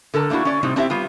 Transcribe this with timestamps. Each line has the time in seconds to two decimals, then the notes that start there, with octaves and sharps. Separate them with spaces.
0.14 D3 A4 A#4 A5
0.30 A3 A#3 D4 E4 F#4
0.45 C#4 D5
0.63 A2 C3 G3 C4 D#4
0.76 C4 D4 E4 G4 E5
0.90 G3 B3 F4